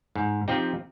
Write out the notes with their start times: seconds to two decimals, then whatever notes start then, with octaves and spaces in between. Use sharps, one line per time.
0.16 G#2
0.48 F3 C4 D#4 G4